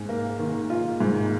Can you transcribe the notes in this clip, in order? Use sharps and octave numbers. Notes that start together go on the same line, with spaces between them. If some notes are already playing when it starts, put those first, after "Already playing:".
Already playing: G#2
A#3
D#3
F4
G#2